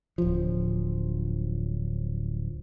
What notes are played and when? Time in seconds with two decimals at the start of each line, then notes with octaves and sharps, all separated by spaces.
0.18 D1 F3